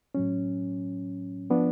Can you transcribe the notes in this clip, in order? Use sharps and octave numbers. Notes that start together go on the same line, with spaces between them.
A2 F#3 C#4
F3 B3 D4